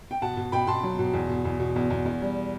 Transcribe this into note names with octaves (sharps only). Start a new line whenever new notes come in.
G5
B2 F#5 A5
B2
B2 G5 B5
B2 A5 C6
F#3
B2
E2
B2
E2
B2
E2
E2
E2
G3